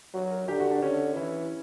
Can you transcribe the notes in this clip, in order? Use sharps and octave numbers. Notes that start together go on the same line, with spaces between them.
F#3 F#4
A#4
D3 G4
F#4
D4
D3 C#4
E3 E4